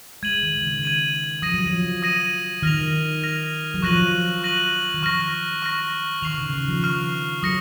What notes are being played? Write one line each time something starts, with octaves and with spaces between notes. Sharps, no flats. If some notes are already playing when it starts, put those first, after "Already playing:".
G#3 G#6 D#7 F#7
D#3
C#3
D#3
G#6 D#7 F#7
F3 D#6 A#6 D#7
F#3
F3
D#6 A#6 D#7
D#3 F6 A#6 F7
F6 A#6 F7
F#3
F3 C#6 F#6 A#6 D#7 F#7
C#6 F#6 A#6 D#7 F#7
D#3
F3 C#6 F6 A#6
C#6 F6 A#6
D#3 C#6 F6 C7 F7
C#3
D#3
F3
C#6 F6 C7 F7
F#3 D#6 A#6 C#7